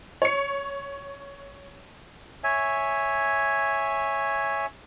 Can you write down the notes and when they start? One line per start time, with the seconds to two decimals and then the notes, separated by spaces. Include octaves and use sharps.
0.22 C#5 C#7
2.44 C#5 E5 G#5